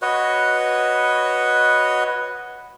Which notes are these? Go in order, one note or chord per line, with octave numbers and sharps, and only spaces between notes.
F#4 B4 C#5 D#5